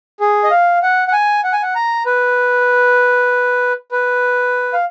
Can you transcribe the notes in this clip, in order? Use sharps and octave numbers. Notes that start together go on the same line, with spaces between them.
G#4
D#5
F5
F#5
F#5
G#5
F#5
G#5
F#5
A#5
B4
B4
F5